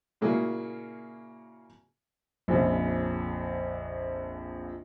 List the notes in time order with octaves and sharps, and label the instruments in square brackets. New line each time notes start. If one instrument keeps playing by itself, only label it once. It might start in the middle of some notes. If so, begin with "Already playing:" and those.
[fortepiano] A#2 C#3 A#3 E4 F#4 G#4
[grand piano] A#1 F2 C#3